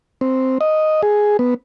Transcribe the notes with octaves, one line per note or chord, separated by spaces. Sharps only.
C4
D#5
G#4
B3